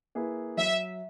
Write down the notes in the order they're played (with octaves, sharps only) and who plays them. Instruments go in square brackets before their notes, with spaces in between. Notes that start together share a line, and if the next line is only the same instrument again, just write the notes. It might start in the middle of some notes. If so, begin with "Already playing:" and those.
[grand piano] A#3 E4 G#4 B4
[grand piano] F#3 [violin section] E5